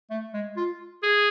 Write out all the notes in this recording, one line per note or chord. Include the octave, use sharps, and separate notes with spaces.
A3
G#3
F4
G#4